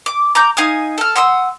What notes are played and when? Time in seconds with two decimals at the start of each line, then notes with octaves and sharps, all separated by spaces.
0.06 D6
0.35 A#5 D6 G6
0.57 D#4 F5 G#5 D#6
0.98 A4 F6
1.16 F#5 C6 D#6 E6